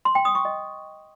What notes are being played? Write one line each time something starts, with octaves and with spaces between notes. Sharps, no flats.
C6
G5
D#6
C#6
D#5